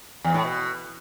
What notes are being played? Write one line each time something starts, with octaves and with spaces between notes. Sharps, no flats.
E2
A2
B2